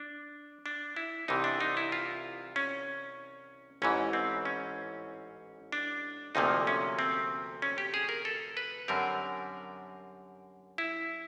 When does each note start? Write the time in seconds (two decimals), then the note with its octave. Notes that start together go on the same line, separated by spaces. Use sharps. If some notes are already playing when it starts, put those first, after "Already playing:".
Already playing: D4
0.66 D4
0.96 E4
1.28 C2 C3 E3 D#4
1.44 D4
1.60 D#4
1.77 E4
1.92 F4
2.56 C#4
3.82 A1 G#2 E3 C#4
4.13 C4
4.45 C#4
5.72 D4
6.35 D2 C3 F3 A#3 D#4
6.67 C#4
6.99 C4
7.62 C#4
7.78 G4
7.94 G#4
8.09 A#4
8.25 A4
8.57 B4
8.88 F#2 D3 G3 C4 A#4
10.78 E4